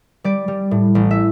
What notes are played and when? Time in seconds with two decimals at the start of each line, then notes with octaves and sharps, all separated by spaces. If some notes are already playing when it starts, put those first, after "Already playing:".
0.24 G3 D5
0.48 G3
0.71 A2
0.95 A1
1.11 E5